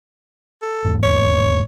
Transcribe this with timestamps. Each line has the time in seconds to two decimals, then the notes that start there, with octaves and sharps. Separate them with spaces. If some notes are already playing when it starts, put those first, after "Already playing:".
0.62 A4
0.85 E1 D#2 G#2
1.03 C#5